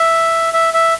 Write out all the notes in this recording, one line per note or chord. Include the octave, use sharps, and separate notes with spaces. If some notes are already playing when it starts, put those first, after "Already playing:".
Already playing: E5
E5
E5